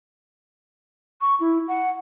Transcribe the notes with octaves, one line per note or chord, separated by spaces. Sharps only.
C#6
E4
F#5